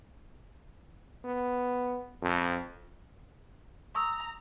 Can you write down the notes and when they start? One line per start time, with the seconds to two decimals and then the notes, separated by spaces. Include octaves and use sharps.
1.25 B3
2.22 F2
3.95 A#5 C#6 D#6 E6